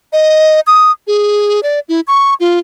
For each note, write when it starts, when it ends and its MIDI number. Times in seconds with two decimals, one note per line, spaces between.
0.13 0.60 75
0.67 0.91 87
1.07 1.60 68
1.63 1.80 74
1.89 2.01 64
2.07 2.34 85
2.40 2.59 65